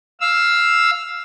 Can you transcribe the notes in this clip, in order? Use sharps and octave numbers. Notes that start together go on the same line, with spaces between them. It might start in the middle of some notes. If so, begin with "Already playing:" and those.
F5 E6